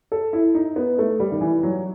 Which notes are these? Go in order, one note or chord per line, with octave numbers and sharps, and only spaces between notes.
A4
E4
D#4
B3
A3
G3
D#3
E3
F#3